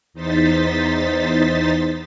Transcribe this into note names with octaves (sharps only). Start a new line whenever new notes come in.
E2 D#4 C5 A6 B6